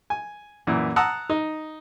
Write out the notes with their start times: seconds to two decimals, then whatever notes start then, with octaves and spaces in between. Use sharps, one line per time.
0.10 G#5
0.67 F#2 A#2 E3
0.96 F#5 A5 A#5 D#6 E6
1.30 D#4